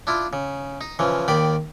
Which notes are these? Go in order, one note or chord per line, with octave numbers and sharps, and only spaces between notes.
D4 E4 F4
C#3
D#4
C#3 E3 F3
D#2 D#3 D5 G5 B5